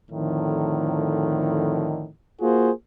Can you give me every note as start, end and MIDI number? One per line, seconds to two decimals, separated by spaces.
0.11 2.10 41
0.11 2.10 45
0.11 2.10 50
0.11 2.10 51
2.41 2.70 58
2.41 2.70 65
2.41 2.70 66
2.41 2.70 68
2.41 2.70 72